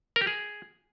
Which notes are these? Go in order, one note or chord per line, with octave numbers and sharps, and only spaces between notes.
A#4
G4
G#4